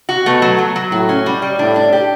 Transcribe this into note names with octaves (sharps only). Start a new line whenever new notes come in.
F#4
B2 A3
F#3
F#3
F#3
A2 F#4
C#4
G3
G3
A2 D4
D4
G4